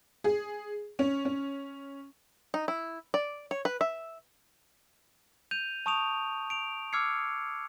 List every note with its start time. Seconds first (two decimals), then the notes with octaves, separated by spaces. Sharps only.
0.24 G#4
0.99 C#4
1.25 C#4
2.54 D#4
2.68 E4
3.14 D5
3.51 C#5
3.65 B4
3.81 E5
5.51 G6 D#7 F7
5.86 A5 C#6 D#6 D7 F7
6.50 D7 F7
6.93 D6 E6 F6 G#6 C7 C#7